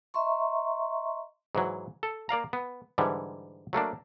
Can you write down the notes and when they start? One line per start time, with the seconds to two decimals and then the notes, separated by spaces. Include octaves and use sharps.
0.14 D#5 E5 A#5 C6 C#6
1.55 G#2 E3 F#3
2.03 A4
2.29 A#3 D5 F5 A#5
2.53 B3
2.98 G#2 D3 E3 G3
3.73 F#3 A3 A#3 D4